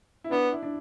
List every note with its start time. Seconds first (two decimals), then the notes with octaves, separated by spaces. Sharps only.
0.24 E4
0.31 B3 D4
0.52 E4
0.63 D4